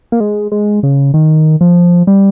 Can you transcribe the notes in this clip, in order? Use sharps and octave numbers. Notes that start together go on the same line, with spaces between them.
A#3
G#3
G#3
C#3
D#3
F3
G3